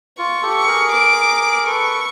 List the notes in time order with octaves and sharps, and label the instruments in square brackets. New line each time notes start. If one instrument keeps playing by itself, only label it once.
[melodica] F4 [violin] C#6
[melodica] G4 A4
[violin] C#6
[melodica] G#4 A#4
[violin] D6
[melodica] A4 B4 [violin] C#6